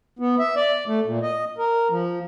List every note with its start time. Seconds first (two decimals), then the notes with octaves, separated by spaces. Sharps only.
0.19 B3
0.39 E5
0.56 D5
0.87 A3
1.06 A#2
1.23 D#5
1.58 A#4
1.90 F3